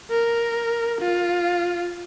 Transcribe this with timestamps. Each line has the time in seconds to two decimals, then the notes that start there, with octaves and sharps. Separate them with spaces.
0.11 A#4
1.01 F4